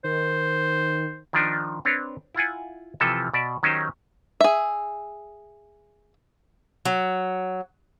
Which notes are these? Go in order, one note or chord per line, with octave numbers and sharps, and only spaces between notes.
D#3 C5
D#3 F3 D4 D#4
C4 D4 B4 C#5
E4 F4 F#5 G#5
C3 E3 F3 A4 E5
B2 D5 E5
D#3 F#3 C#4 D#4 G4 C5
G#4 E5
F#3